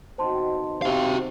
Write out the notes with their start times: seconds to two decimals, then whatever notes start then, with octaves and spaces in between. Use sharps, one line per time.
0.18 B2 D#3 C4 C5 A5 C6
0.82 C3 F#4 F5